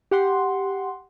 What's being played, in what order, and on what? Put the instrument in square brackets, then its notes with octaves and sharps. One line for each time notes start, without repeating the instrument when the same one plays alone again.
[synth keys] G4 F#5 C6